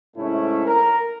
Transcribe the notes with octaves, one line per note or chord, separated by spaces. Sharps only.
G#2 C3 A3 C#4 E4
A#4